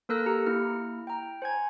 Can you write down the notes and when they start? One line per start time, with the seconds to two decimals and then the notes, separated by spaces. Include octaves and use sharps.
0.09 A#3 A4 A#4 E6 F#6 A#6
0.26 G4 A#5 C#7
0.46 A#3 E4 F6
1.07 G5 A#5
1.42 C5 G#5 G#6